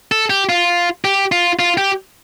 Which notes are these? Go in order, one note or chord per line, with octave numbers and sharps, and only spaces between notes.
A4
G4
F4
G4
F4
F4
G4